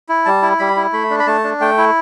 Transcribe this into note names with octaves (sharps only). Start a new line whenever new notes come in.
E4
G3 A5
E4
G3 B5
E4
A3 B5
D4
B5
A3 A5
D4
A3 G5
E4